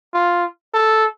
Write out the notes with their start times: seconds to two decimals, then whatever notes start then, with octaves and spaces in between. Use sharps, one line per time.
0.13 F4
0.74 A4